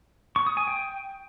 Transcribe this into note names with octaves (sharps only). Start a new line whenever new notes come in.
C#6
D#6
G#5
G5